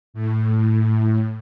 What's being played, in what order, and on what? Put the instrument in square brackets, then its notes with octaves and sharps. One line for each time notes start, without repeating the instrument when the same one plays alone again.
[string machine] A2